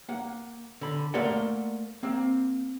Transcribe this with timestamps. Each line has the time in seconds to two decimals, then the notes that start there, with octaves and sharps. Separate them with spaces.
0.09 A#3 F#5
0.81 D3 B5
1.14 A3 A#3 A#4 C5 D5 F#5
2.03 A#3 C4